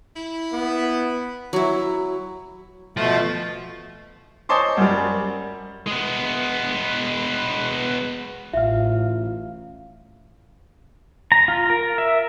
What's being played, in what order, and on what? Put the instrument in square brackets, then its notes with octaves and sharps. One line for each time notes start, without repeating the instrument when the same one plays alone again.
[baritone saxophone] E4
[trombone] B3
[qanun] F#3 E4
[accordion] B2 A3 [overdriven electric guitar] F3
[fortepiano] C5 C#5 D#5 A5 C6 D6
F#2 G3
[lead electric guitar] G#3 B3
[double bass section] A1 [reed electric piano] F4 F5 [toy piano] E5
[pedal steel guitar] A#5
F4
A#4
E5